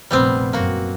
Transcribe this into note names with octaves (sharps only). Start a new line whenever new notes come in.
F1 A#1 G3 B3 C4
F#2 A#3 F#4